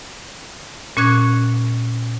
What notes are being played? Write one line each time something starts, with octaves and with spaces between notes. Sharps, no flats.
A#2 C#4 F#6 G#6